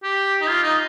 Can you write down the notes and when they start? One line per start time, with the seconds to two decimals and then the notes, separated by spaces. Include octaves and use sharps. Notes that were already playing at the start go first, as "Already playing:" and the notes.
0.04 G4
0.41 D#4
0.48 F4
0.63 D#4